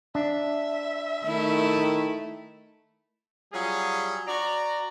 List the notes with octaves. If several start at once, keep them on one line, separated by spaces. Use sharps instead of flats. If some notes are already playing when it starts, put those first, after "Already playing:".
D4 E5
D#3 A3 E4
F#3 G3 C#4 F4 G#4
F#4 D5 A#5